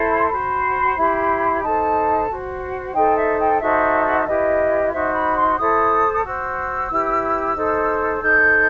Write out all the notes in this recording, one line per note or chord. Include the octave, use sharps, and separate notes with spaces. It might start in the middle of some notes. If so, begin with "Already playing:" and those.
Already playing: E4 A4 C5
B5
C6
F#4 C5 B5
E4 G4 C5
D#4 A4 C5 A5
F#4 C5
D#4 A4 C5 G5
E5
G5
D#4 F#4 A4 C5 E5
E5
E4 G4 B4 D#5
D#4 F#4 C5 E5
B5
C6
E4 A4 C5 D#6
D#6
F#4 C5 E6
E4 G4 B4
D#4 A4 C5
D#4 A4 C5 G6